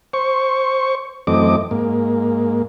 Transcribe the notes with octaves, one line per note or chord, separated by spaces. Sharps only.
C5 C#6
F#2 E3 A3 C4 D#5 D6
G#2 A#3